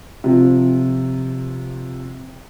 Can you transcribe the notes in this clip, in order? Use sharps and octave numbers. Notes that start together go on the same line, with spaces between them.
C3 F3